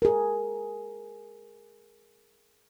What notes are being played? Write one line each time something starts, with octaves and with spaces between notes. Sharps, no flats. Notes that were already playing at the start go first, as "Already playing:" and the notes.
G#4 A#4